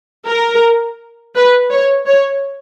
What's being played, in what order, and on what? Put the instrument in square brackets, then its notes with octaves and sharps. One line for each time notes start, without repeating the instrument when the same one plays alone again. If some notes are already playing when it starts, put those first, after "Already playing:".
[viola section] A#4
B4
C#5
C#5